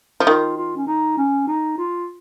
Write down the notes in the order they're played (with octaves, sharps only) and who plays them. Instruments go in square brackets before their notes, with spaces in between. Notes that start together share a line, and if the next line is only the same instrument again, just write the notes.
[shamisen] F3
[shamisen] D#3 [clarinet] F4
[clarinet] F4
C#4
D#4
C#4
D#4
F4